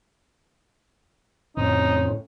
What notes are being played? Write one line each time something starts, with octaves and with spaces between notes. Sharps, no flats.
F2 A2 C#3 C4 C#4 D#4